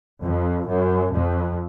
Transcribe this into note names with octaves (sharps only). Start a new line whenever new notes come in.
F2
F#2
F2